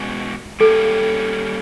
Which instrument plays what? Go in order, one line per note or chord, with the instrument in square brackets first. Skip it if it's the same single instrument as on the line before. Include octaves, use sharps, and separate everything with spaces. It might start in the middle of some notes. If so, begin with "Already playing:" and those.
Already playing: [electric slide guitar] B2 G#3 C#4 F#4
[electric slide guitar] G3 A#3 C#4 [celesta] A4